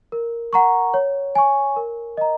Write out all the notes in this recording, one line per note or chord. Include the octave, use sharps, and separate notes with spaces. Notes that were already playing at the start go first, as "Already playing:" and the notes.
A#4
F#5 A#5 C#6
C#5
G#5 C#6
A#4
D#5 A#5